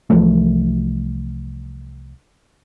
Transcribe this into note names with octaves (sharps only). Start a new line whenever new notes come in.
C2 E3 F3 A3